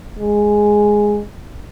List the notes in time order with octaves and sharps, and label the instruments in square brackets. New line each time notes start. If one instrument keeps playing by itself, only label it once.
[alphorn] G#3